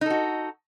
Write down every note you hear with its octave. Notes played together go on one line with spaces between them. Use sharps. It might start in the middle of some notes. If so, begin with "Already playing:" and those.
D#4 F#4 A4